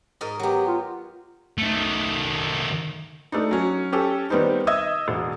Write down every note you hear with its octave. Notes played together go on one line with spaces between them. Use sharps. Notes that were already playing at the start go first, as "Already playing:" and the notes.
G#2 A#4 D#5
F#3 B3 G4
F4
D#3 A3
A3 D4 D#4
F#3 C#4
C#4 G4 A4
D#3 G3 B3 C4 D#4
D#5 E5 D#6 E6 G#6
E1